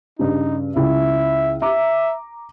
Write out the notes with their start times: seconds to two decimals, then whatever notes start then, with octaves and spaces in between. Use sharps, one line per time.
0.19 G2 C#3 D#4
0.76 C#2 E4 E5
1.62 E5 A#5 D6